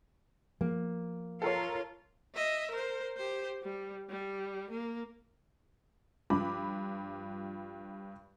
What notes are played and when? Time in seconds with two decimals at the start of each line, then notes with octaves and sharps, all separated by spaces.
0.61 F3 A#3
1.42 F4 A4 A#4 C#5
2.35 D#5 E5
2.71 A#4 C5
3.16 G4 C5
3.63 G3
4.10 G3
4.70 A#3
6.30 G2 F3 B5 D6